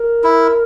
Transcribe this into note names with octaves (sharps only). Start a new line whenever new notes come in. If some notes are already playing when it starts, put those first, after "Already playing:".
Already playing: A#4
E4